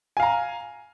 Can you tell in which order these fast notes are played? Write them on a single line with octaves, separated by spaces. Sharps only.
G#5 F5 A#5